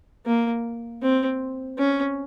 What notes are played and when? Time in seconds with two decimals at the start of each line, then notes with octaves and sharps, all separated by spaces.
0.26 A#3
1.02 C4
1.79 C#4